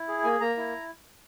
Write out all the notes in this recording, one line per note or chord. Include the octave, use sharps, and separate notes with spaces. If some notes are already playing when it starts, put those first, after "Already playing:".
Already playing: E4
G#4
A#3 G#5
A#3 A#5
E4